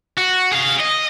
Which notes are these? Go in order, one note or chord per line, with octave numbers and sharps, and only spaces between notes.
F#4
G#4 F5
D#5